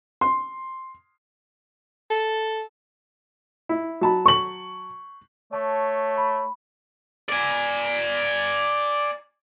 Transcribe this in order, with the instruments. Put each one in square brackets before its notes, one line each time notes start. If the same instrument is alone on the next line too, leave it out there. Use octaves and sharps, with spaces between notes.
[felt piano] C6
[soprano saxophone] A4
[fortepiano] E4
F#3 A5 B5
[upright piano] C#6 F#7
[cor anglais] A3 [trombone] C#5 [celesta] A5
[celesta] B5
[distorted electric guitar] D5 G#5